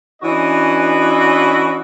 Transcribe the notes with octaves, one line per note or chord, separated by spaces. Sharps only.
E3 C#4 D4 F#4 B4 D#5